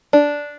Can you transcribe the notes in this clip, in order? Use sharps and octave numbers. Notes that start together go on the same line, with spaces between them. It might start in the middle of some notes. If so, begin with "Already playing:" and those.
D4